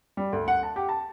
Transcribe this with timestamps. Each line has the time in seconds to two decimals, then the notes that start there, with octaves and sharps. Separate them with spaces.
0.17 G3
0.32 D2
0.48 F#5
0.63 A5
0.76 G4
0.89 A5